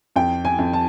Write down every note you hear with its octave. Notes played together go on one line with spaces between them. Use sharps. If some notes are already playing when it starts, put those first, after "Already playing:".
F2 G5
G#5
F2
A5